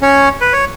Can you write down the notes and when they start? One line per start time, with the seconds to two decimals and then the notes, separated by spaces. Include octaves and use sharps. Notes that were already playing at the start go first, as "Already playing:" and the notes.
0.02 C#4 C#5
0.41 B4
0.53 C#5